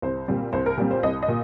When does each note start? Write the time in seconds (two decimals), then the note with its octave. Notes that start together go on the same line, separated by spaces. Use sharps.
0.02 C2 C5
0.28 A#2 G3 C4
0.53 C2 C5
0.66 A#4
0.77 A#2 G3 C4 G4
0.91 C5
1.03 C2 D#5
1.22 D#5
1.28 A#2